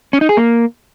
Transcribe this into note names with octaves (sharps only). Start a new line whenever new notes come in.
C#4
D#4
G#4
A#3